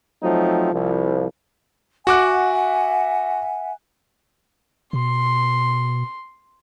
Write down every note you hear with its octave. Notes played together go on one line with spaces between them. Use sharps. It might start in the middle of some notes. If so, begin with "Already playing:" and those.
F3 F#3 A3 C4 D#4
C2 F3
F#4 E5 F#5 G#5 D6 F#6
B2 C6